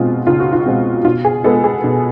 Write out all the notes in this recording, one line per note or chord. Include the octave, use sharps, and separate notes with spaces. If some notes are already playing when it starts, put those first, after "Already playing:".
Already playing: B2 G#3 C4 F4
C#2 F4
F#4
F4
B2 G#3 C4
B2 F4
G#4
G#3 B3 A4
G#4
B2